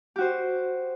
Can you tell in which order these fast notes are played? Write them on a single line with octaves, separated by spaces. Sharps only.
G4 F#4 C5